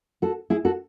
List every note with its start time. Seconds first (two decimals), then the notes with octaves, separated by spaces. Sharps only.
0.22 F#4 A4
0.50 E4 G#4
0.65 F#4 A4